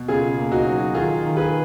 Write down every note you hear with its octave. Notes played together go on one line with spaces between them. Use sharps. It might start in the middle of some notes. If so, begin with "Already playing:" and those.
Already playing: B2
C#3 F4 G#4
A#3
D#4 F#4
F#3
D#3 F4 G#4
D#3
G#4 B4